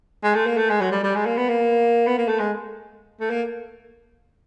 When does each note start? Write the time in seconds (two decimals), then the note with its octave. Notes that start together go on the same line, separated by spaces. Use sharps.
0.23 G#3
0.35 A3
0.46 A#3
0.57 A3
0.70 G#3
0.81 F#3
0.92 G3
1.03 G3
1.15 G#3
1.26 A#3
1.37 B3
1.49 A#3
2.07 B3
2.18 A#3
2.28 A3
2.39 G#3
3.21 A3
3.30 A#3